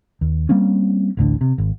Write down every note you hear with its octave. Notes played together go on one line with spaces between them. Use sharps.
D#2
G3 A#3 C4 C#4
A1 D2 A2 D3
C3
G#1